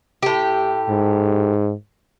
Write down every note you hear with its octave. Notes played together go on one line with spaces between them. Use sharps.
A2 G4
G#2